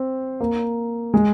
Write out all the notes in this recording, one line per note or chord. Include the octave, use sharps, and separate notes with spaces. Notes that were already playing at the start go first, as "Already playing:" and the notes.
Already playing: C4
A#3
G#3